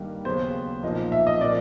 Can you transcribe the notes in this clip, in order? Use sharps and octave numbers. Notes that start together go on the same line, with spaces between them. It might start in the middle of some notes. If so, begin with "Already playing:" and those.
Already playing: G2 D#3 G3 A#3
D#2 C#3 F#3 B3 C5
B1 A#2 F3 A#3 D#4
E5
D#5
A#2 F3 A#3 D5